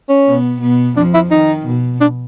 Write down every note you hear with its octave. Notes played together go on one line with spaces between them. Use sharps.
C#4
B2 B3
B2 B3
F2 F3 D4
E4
D#3 D#4
B2
D4